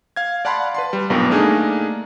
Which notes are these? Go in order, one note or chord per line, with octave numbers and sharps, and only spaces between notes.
F5 G#6
D5 F5 F#5 A5 B5 C6
B4 A5 C6
G3
B1 G2 A#2 B3 A#4 B4
A3 A#3 D4 D#4 G#4 A#4